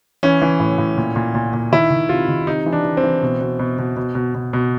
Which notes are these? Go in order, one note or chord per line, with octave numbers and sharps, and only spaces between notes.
E3 C#4
E3
A2
A2
A#2
A#2
A#2
A#2
D#3 E4
D#3
C3 F4
D#3
C3 D#4
E3
D4
E3
C4
E3
B2
B2
B2
B2
B2
B2
B2
B2